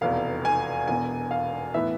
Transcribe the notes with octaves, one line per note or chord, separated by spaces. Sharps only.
F1 E2 B2 F5
G#5
E1 E2 B2 G#5
F5
A2 E3 B3 E5